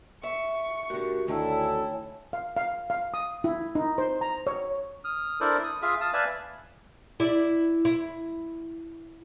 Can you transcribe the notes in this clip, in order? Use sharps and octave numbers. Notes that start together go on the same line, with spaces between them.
E5 C#6
A2 D3 F#4 G4 A#4
D2 D#3 E4 A4 C#5 G5 G#5
F5
F5
F5
D#6
E4
D#4
C5
A#5
C#5
D#6 F6
D4 E4 A4 A#4 C5 D5
D#6
F4 G#4 E5 F5
F5 A5 D#6
B4 D5 E5 F5 G#5 A5
E4 D5
E4